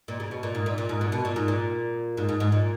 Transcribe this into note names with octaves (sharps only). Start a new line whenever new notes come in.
A#2
C#3
B2
A#2
G#2
A#2
A#2
G#2
A#2
B2
A#2
G#2
A#2
G#2
G#2
G#2
A#2